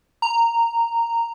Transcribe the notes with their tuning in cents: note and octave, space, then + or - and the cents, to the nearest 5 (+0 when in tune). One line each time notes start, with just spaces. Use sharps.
A#5 -10